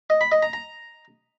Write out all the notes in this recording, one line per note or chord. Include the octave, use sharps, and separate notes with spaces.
D#5
B5
D#5
A#5
A#5